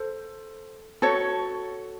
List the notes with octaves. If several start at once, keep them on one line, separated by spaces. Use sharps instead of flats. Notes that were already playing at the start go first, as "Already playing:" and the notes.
Already playing: A4 C5
F#4 A4 C#5